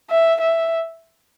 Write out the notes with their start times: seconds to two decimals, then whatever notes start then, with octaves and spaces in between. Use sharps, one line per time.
0.11 E5
0.41 E5